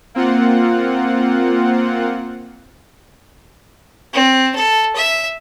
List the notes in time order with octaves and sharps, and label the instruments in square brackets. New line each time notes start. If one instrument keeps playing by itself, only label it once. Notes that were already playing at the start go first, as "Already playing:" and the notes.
[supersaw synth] A#3 C4 F4 F#5
[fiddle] C4
A4
E5